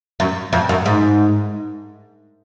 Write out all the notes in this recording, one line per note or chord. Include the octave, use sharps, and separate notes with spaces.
F#2
F2
F#2
G#2